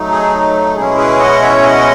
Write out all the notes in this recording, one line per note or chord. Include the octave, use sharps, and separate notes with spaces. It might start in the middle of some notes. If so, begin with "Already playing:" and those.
Already playing: F#3 A3 D#4
G#4
B2 G#3 C#4 E4 G#4
G#4 B4
D#5 F#5
C#5 E5
D#5 F#5